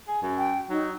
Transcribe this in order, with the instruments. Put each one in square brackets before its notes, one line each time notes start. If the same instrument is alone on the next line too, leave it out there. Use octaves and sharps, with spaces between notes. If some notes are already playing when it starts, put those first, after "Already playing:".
[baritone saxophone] G#4
F#2
[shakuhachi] G5
[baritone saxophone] F#3 [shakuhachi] D#4